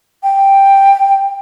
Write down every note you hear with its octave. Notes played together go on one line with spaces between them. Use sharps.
G5